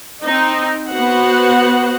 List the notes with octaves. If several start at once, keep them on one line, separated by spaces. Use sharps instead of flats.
C4 D#4
B3 F#4 C5 F#5